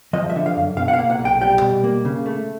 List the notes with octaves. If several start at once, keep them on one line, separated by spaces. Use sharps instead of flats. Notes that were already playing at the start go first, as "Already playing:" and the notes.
F3 D#5
E5
D3
F5
F#2
B2 F5
F#5
F5
A#3
F#5
B1
G5
G3 G5
B2
A#3
C#3
A3